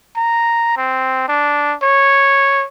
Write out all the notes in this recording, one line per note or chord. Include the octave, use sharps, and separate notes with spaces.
A#5
C4
D4
C#5